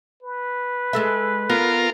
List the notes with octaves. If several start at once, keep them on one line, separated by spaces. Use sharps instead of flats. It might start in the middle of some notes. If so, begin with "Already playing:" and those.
B4
G#3 A4 E5
B3 F4 A#4